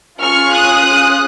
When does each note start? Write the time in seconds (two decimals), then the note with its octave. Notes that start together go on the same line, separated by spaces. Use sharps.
0.21 C#4 F4 G#4 C#6 F6
0.54 D#6 F#6